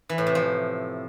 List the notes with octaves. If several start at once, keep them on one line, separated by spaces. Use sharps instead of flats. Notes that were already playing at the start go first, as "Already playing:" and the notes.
E3
A2
C3
F3